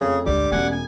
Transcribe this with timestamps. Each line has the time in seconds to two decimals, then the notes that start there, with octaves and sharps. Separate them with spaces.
0.01 F2 C#3 A3 G#4
0.26 G#1 D2 D3 G3 G4 D6
0.52 E1 A3 C#4 F#5 G#5 D6
0.72 G#5